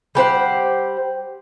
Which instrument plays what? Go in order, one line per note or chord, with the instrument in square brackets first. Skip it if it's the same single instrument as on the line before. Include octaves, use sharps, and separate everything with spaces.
[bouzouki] G3 G4 C5 F#5